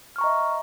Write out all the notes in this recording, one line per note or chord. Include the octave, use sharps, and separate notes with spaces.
D#5 E5 A#5 C#6 F6